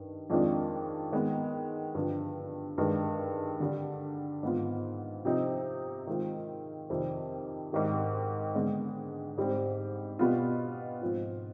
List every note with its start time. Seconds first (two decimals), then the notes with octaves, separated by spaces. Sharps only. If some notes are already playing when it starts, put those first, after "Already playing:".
Already playing: G2 D#3
0.30 F2 D#3 G#3 D4 F4
1.12 D#3 G#3 B3
1.95 G2 D3 F3
2.78 G2 D#3 G#3
3.60 D3 G3 D4
4.43 G#2 D#3 B3 F4
5.25 C3 F3 C4 D#4
6.07 D#3 G#3 C4 F4
6.90 F2 C3 D#3 G3 C4
7.73 G#2 D#3 G3
8.54 D3 G#3 B3 D4
9.37 G#2 G3 C4
10.19 B2 G3 B3 F4
11.02 G#2 F3 C4 F4